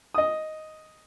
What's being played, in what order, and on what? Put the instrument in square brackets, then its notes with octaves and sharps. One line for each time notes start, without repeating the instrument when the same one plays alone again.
[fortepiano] D#5 D#6